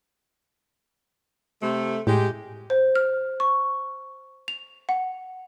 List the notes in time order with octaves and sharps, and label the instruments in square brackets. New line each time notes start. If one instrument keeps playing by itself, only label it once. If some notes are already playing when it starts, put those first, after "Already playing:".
[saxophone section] C3 A3
[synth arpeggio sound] A2 [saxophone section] G#3 G4
[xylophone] C5
F6
C#6
F7
F#5